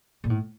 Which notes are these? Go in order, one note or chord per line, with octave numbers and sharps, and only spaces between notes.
A#2
A2